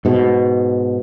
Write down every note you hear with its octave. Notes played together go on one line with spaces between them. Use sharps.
G#2 B2